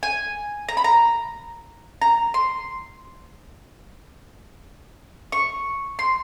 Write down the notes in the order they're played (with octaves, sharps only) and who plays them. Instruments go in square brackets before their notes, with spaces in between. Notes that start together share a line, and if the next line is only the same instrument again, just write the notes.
[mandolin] G#5
A#5
B5
A#5
A#5
C6
C#6
C6